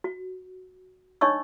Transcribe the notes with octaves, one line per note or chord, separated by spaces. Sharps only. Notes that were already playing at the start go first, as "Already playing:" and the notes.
F#4
D4 D#4 C#5 D#5 C#6 E6